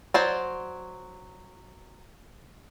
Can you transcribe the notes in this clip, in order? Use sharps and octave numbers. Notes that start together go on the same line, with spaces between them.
F#3 C5 D5